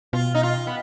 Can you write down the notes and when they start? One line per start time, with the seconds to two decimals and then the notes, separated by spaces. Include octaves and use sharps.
0.13 B2 F4
0.35 D#4
0.43 F4
0.67 B3